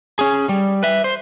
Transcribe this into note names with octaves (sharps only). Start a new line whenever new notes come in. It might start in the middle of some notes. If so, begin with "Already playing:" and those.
C#4 G#4
G3
B4 E5
C5